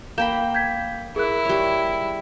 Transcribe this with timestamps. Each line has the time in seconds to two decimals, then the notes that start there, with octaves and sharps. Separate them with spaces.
0.18 A#3 G5 B5 G6 E7 G7
0.55 G6 G#6 B6
1.16 E4 G#4 A#4 F#6
1.45 G3 C#5